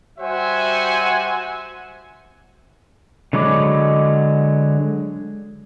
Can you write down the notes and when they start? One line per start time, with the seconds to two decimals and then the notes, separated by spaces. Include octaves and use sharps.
0.19 G3 F#4 C5 E5 F#5 G#5
3.33 D3 F#3 G#3 B5 D6